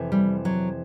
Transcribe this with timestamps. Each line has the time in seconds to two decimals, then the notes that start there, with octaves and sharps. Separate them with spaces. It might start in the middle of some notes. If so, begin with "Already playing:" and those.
Already playing: F2 C3 E3
0.12 G3
0.45 F#3